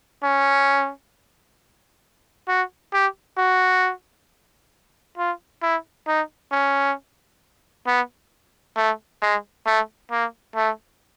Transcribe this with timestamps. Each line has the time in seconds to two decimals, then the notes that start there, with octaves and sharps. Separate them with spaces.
0.23 C#4
2.48 F#4
2.93 G4
3.38 F#4
5.18 F4
5.62 E4
6.08 D#4
6.52 C#4
7.87 B3
8.77 A3
9.22 G#3
9.66 A3
10.11 A#3
10.56 A3